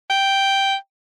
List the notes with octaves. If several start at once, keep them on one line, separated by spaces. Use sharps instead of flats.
G5